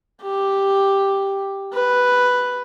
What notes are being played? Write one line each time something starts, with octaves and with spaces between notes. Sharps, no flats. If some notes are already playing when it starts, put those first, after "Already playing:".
G4
B4